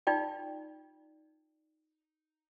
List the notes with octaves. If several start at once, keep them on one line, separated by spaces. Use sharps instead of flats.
D#4 F4 D5 G5